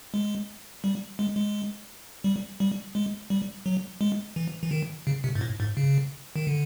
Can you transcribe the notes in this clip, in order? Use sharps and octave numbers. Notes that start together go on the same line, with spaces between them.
G#3
G3
G#3
G#3
G3
G3
G#3
G3
F#3
G#3
E3
E3
D#3
C#3
C3
G#2
A2
G#2
C#3
D#3
D3